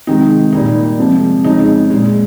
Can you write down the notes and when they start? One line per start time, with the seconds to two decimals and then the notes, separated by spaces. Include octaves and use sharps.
0.07 C3 D#3 G#3 D#4
0.53 A#2 G3 A#3 D#4
0.99 C3 F3 G#3
1.44 F2 C#3 G#3 D#4
1.90 A#2 G#3